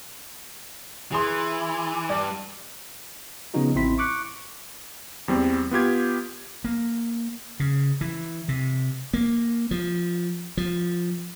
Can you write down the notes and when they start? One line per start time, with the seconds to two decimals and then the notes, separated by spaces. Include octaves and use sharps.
1.12 E3 G#4 C6
2.09 G2 D5
3.54 C#3 F3 B3 C#4 D#4 F#4
3.75 A1 C4 E4 C6 B6
3.98 C#6 D6 F#6 C#7
5.28 E2 G3 C4
5.71 B3 F4 G4 G#6
6.64 A#3
7.60 C#3
8.01 E3
8.48 C3
9.14 A#3
9.71 F3
10.57 F3